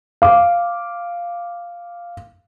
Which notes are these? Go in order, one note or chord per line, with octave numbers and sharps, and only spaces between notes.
F5 D6